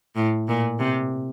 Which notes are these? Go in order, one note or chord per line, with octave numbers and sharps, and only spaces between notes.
A2
A#2
C3